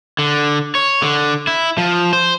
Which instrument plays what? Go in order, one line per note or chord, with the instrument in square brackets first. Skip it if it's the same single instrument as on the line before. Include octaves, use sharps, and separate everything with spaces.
[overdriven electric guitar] D3
C#5
D3
E4
F3
C5